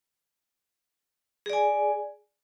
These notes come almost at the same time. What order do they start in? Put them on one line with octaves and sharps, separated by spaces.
G#4 D5 G#5